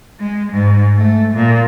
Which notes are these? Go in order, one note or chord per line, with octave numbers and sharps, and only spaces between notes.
G#3
G#2
A3
A#2